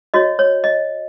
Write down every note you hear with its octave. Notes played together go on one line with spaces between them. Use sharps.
F#4 C#5 D#5
C#5
D#5